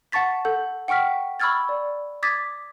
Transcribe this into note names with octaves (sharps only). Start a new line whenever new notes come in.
F#5 A5 C#6 A6 B6
A4 F#5 G6
F#5 G5 C#6 F6 B6
B5 C#6 E6 F6 G#6 A6
D5
D6 D#6 G#6 A6 B6